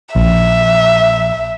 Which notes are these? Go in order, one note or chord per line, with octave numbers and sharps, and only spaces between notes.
A#1 E5